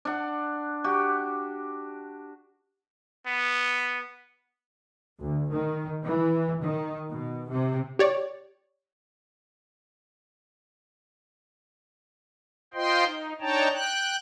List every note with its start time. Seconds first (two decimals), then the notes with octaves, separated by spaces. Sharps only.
0.05 D4 F#5
0.84 F#4 G4
3.26 B3
5.21 D2
5.52 D#3
6.04 E3
6.63 D#3
7.10 B2
7.50 C3
7.99 G4 C#5 D5
12.74 F4 C5 D#5 G5 C6
13.05 D#4
13.41 D4 D#4 C#5 G5 A5 A#5
13.72 G5 F#6